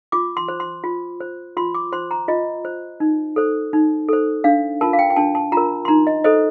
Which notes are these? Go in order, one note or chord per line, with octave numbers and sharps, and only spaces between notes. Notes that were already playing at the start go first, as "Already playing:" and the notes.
F4 D6
C6
C5
C6
F4
C5
F4 C6
D6
C5 C6
A#5
F4 D#5
C5
D#4
A4 C5
D#4
A4 C5
D4 F5
F4 A#4 A5
F5
G5
G5
D4 A5
A5
F4 A#4 A#5
C6
D#4 A#5
D#5
A4 C5 D#5